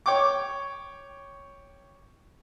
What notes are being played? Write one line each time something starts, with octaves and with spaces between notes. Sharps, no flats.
C#5 G5 C#6 D6